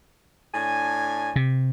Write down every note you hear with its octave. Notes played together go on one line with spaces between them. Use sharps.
A2 D4 G#5
C3